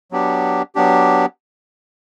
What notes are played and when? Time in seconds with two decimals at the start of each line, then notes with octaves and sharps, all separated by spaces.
0.11 F#3 B3 D4 G4
0.75 F#3 B3 D4 G4